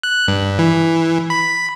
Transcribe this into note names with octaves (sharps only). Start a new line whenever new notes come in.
F#6
G2
E3
B5